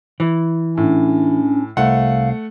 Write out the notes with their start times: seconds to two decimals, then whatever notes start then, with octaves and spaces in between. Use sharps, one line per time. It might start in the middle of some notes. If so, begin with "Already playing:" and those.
0.20 E3
0.77 A2 C#4 D4
1.77 C2 A3 F5 F#5